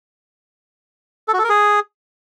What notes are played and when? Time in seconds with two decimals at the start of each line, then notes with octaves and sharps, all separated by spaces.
1.28 A4
1.33 F#4
1.39 A4
1.44 A#4
1.49 G#4